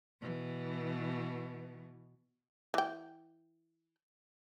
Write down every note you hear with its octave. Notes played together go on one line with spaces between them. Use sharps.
B2 E3
E3 G5